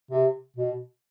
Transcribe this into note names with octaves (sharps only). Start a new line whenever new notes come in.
C3
B2